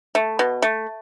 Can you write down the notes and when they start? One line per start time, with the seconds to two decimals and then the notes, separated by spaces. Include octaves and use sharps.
0.15 A3
0.39 B2
0.62 A3